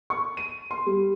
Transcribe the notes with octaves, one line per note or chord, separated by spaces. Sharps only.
C#6
D#7
C6
G3